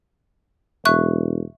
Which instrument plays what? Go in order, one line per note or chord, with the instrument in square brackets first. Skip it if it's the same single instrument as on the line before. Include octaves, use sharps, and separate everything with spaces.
[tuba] E1 [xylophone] E5 C#6 F#6